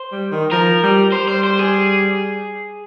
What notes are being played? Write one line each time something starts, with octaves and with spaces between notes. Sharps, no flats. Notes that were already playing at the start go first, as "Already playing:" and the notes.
Already playing: C5
G3
D#3
F3 A#4
G3
G3 C5
C5
C5
G#4